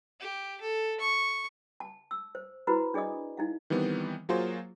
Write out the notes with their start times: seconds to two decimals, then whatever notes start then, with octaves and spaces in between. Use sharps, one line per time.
0.20 G4
0.61 A4
1.00 C#6
1.80 A5
2.11 E6
2.35 C5
2.67 E4 F#4 B4 C5 A#5 B5
2.94 D4 G#4 D5 D#5 D#6
3.37 D#4 E4 F5
3.70 D#3 E3 G3 B3 C4
4.29 F#3 A#3 F4 F#4 G#4 C5